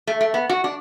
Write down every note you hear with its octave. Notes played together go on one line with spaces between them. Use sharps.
A3
A3
B3
F#4
D4